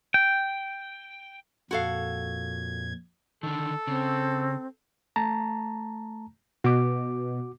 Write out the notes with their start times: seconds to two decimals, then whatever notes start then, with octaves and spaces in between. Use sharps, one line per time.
0.14 G5
1.71 F2 A#2 F#4 A4 F5 G#6
3.43 D3 D#3 A4
3.87 C#3 C4
5.16 A3 A5 A#5
6.64 B2 F#4 D6